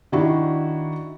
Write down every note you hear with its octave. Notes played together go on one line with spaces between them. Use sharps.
D#3 D4 E4 F#4